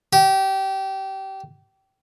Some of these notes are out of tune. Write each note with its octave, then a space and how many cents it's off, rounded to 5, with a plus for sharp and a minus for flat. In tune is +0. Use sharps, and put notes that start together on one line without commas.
G4 -25